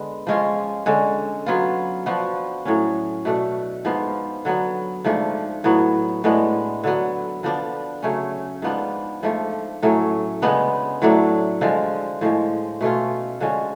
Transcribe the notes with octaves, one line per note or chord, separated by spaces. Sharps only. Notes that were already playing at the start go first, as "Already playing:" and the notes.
Already playing: D3 G#3 B3
F3 G#3 C#4 F4
D3 G#3 C#4
F#3 B3 F4
F3 B3 D4 F#4
A2 F#3 C#4
B2 A3 D4
G#2 F3 B3 F4
D3 F#3 B3
G#2 F3 A3 D4
A2 F#3 B3
A2 G#3 B3 D4
D3 F#3 B3
D3 F3 B3 D4
C#3 F#3 A3 C#4
G#2 F3 B3 D4
G#2 F3 A3
A2 F#3 A3 C#4
C#3 G#3 B3 D4
A2 F#3 A3 D4
D3 F3 G#3
A2 F3 G#3
B2 A3 C#4 F4
D3 F3 G#3 C#4